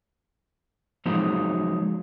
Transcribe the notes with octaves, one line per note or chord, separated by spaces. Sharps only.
F3 F#3 G#3 A#3 D#4